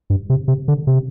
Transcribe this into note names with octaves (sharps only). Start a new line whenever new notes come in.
G2
C3
C3
D3
C3